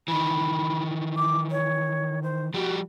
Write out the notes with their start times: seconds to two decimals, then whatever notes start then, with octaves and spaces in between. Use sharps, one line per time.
0.08 D#3 E3 B5
1.17 D6
1.51 C#5
2.23 C5
2.54 F3 G3 F#4 G4